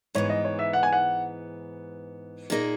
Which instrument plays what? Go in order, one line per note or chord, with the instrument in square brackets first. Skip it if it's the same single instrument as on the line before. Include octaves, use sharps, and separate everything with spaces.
[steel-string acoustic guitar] G#2 E3 B3 [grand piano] C#5
[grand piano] D#5
C#5
E5
F#5
G#5
F#5
[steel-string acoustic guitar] A#2 A#3 D#4 G#4 D#5